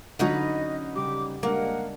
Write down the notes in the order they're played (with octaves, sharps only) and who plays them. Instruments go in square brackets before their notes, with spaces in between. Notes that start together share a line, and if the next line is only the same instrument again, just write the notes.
[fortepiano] D3 F#3 [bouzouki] C#4 D#4 B4 [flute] D#5
[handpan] C#3 G3 G4 [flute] D6
[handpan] G3 G#3 D4 [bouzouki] A#3 [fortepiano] A#4 [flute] F#5